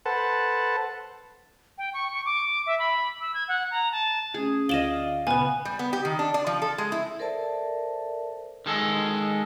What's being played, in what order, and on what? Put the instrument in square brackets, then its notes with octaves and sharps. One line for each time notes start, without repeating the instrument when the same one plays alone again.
[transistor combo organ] A4 B4 C5 F#5 A5
[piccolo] G5
C#6
C#6
D6
E5
B5
E6
G#6
F#5
A#5
A5
[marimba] A3 C#4 [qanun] G#4
[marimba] D2 D3 F4 [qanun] D5 D#5 [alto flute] F5 [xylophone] E7 G7
[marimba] A#2 C#3 [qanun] B3 [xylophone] B4 G#5
[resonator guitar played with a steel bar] G3
B3
G4
D#3
D4
D5
F3
A4
G#3
E4
[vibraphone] A4 A#4 C5 D5 E5 A5
[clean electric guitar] D#3 G#3 A4